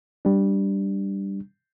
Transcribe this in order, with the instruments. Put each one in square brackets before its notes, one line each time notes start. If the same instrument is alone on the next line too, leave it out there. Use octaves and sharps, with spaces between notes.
[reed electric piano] G3 D4